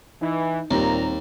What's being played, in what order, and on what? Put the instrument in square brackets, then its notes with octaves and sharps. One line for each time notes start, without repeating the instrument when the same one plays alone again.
[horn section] E3 [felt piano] D#4
[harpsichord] D#2 [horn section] A#2 A#5 [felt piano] G3 C4